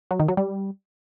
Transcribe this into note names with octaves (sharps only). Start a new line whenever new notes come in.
F#3
D#3
F#3
G3